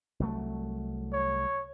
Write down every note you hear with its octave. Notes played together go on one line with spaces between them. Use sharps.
C2 F#3 A3
C#5